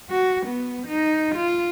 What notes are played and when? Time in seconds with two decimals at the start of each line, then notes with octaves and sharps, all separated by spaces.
0.11 F#4
0.47 B3
0.87 D#4
1.36 F4